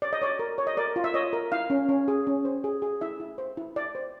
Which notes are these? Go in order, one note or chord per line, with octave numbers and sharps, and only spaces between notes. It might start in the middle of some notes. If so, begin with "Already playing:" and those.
C#5 D5
D#5
C#5 D5
A#4
C#5
D#5
A#4 D5
F4
E5
C#5 D#5
A#4
E4 F5
C#4
C#4
G#4
C#4
C5
G#4
G#4
E4 E5
E4
C5
E4
E4 D5
C5